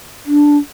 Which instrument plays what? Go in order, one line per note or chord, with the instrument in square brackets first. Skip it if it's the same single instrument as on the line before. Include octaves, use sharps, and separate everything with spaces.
[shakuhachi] D4